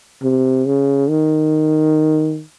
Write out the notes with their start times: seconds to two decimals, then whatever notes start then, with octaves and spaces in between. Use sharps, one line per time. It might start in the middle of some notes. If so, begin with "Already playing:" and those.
0.23 C3
0.66 C#3
1.09 D#3